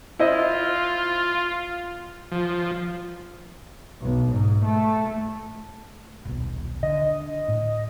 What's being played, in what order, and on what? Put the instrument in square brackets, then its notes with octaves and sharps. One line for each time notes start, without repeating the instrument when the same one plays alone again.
[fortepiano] E4 C5 D#5 [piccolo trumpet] F4
[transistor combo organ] F3
[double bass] B1
G#2
A3
[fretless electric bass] D#1 B1
[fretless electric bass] D3 [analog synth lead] D#5
[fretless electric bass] A2